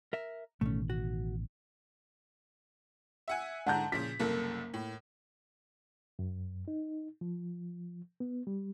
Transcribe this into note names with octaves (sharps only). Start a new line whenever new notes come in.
A#4 E5
A1 B2 D#3 A3 C#4
F#4
E5 F#5 G#5
G#2 D3 F#5 A5 A#5 G6
A#2 C#3 F3 B6
F#1 C2 A#3 A4
A2
F#2
D#4
F3
B3
G3